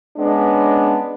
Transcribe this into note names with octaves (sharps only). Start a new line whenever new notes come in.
G#3 B3 C#4 D4